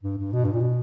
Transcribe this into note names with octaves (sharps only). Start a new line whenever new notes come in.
G2
G2
B2
G2
A#2
B2